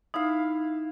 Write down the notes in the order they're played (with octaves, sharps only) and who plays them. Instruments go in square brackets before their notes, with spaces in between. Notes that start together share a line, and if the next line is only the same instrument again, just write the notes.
[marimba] D#4 [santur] E4 F5